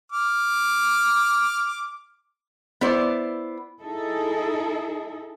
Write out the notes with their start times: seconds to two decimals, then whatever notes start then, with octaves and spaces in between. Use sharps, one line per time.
0.12 D6 F6
2.81 B3 E4 C5 D5
3.82 D#4 E4 G#4 A4